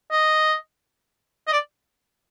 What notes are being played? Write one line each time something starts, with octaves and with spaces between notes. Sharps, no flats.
D#5
D#5
D5